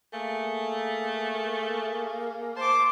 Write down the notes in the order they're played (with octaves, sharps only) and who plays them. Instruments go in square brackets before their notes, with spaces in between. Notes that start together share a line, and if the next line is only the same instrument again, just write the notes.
[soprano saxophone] A3 [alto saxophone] A#3 [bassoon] G#4
[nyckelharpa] C5 D6 [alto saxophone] A5